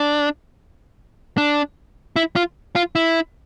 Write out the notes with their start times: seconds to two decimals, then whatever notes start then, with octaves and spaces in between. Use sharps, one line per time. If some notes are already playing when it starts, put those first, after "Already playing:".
Already playing: D4
1.38 D4
2.16 E4
2.36 F4
2.76 F4
2.95 E4